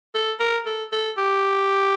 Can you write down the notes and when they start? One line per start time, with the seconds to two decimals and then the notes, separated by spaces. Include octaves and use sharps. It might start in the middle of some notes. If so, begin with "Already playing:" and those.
0.14 A4
0.40 A#4
0.66 A4
0.92 A4
1.18 G4